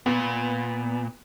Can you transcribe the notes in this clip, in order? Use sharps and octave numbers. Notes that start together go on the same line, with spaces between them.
A#2 B3